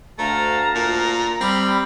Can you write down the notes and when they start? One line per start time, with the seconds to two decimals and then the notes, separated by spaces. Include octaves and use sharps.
0.19 D2 A3 F5 A5 A#5
0.75 A#2
1.41 G3 C4 B5